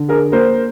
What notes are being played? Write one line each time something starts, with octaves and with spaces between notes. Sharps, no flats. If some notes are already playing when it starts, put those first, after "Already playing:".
Already playing: D3
G#4 A#4
A#3 A#4 C5